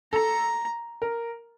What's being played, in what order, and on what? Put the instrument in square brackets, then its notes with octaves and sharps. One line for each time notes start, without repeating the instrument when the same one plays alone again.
[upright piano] A4 [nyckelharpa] A#5
[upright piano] A#4